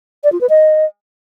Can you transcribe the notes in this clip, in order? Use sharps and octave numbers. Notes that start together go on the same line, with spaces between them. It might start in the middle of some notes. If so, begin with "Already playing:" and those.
D5
F4
B4
D#5